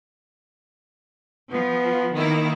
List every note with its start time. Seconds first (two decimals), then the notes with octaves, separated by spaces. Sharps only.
1.52 F3 B3
2.15 D#3 A#3 E4